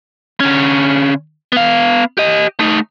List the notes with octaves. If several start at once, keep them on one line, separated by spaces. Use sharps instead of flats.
D3 C#4
B3 F5
G4 D#5
A3 D#4